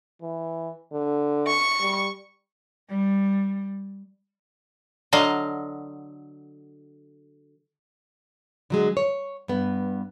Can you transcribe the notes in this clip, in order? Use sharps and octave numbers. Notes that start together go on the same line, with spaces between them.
E3
D3
C#6
G3
G3
D3 F#3 D#5 F5
D3 F#3 G#3
C#5
G2 B3